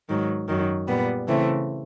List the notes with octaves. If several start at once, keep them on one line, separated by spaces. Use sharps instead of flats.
G#2 D#3 F#3
F#2 D#3 F#3
A#2 G3 B3
C#3 E3 A3 C4